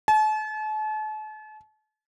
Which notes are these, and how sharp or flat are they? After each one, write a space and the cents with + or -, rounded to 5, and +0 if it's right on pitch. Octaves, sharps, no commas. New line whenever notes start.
A5 -40